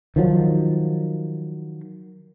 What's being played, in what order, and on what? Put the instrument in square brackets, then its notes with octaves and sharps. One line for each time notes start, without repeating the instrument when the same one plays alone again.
[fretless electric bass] D#3 F3 F#3